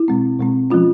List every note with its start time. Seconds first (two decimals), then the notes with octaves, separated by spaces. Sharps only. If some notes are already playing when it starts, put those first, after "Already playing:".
Already playing: E4
0.08 B2 G#3 C4
0.40 B2 G#3 C4
0.70 F3 G#3 C#4 F4